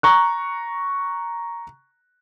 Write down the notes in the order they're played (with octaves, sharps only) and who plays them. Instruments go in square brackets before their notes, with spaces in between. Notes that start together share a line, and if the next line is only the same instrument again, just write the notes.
[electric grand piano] A#5 C#6 F#6